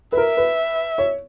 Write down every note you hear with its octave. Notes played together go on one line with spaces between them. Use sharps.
B4
A#4 E5
B4
C#5